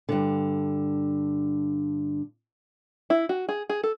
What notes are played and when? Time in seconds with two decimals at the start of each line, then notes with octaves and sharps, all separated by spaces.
0.09 G2 D3
3.10 E4
3.29 F#4
3.49 G#4
3.69 G#4
3.83 A4